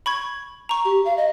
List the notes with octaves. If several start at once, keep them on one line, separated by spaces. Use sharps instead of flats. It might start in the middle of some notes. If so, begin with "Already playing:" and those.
B5 C#6 G#6
A#5 C#6
G4
F5
D#5